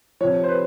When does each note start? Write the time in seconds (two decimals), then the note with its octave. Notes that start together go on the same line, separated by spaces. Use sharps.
0.21 C3 F3 C#5
0.44 C5
0.49 B4